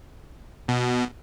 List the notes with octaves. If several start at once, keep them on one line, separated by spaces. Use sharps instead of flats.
B2